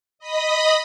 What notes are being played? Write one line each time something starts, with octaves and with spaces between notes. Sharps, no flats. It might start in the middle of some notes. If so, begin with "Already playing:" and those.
D#5 B5 D#6